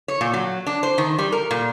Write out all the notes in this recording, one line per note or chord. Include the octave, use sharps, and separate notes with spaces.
C#5
A#2
F#3
D4
C5
D#3
G3
A#4
A#2